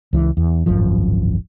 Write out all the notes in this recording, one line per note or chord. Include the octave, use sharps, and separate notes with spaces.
C#2 E3
E2
D1 G#1 F#2 F3